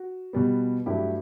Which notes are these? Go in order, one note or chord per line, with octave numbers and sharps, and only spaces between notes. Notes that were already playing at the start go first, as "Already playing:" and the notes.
Already playing: F#4
B2 G3 B3
G2 F#3 A3 E4 G4